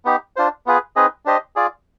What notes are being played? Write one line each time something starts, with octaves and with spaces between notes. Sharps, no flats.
B3 D#4 G4
D4 F4 C5
B3 F4 G#4 B4
C4 D#4 G#4 B4 D#5
D4 G4 C5 D#5
F4 G#4 D5